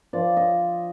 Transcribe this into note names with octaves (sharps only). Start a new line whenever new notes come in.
F3 D5
D#5